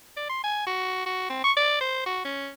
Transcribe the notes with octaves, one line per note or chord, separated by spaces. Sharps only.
D5
C6
G#5
F#4
F#4
C4
C#6
D5
C5
F#4
C#4